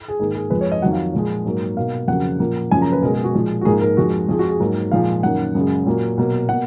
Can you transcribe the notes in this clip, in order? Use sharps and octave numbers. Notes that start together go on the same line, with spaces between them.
G#4
G#2 D#3 A#3 G#4
G#4
F2 F3 G#3 B4
C#5
D#5
F2 D#3 F#3 F#5
F5
A#2 F3 G#3
G#2 F#3 A#3
B2 A#3 F5
F2 C#3 F#3 A#3 F#5
A#2 F3 A#3
F#2 C#3 F3 A#3 G#5
A#5
B4
B2 G#3 A#4
G#4
F#4
A#2 F3 G#3
F#4
G#2 F3 A#3 G#4
A#4
F2 F3 G#3 F#4
F2 F3 G#3 G#4
F#4
G#4
G#2 F#3 A#3
A#2 F3 G#3 F5
F#2 D#3 A#3 F#5
F#2 C#3 G#3
A#2 F#3 A#3
B2 F#3 A#3
B2 A#3 F#5